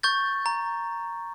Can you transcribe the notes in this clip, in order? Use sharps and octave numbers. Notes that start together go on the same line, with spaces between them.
C#6 G6 A6
A#5